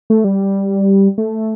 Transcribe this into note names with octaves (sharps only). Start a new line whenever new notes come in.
A3
G3
A3